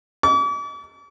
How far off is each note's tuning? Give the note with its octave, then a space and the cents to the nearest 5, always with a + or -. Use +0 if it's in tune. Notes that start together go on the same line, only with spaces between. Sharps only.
D6 -45